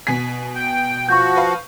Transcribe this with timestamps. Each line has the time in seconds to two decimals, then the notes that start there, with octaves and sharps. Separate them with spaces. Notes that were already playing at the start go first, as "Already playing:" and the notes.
0.07 B2 G#5 B6
0.55 G5
1.09 F3 F#4 C#6 G6
1.36 B4 F5